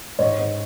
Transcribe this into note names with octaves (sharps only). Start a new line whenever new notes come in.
G#2 C#5
G#2